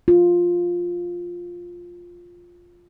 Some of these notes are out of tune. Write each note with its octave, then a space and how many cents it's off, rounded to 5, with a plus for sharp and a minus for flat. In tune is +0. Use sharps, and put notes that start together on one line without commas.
F4 +5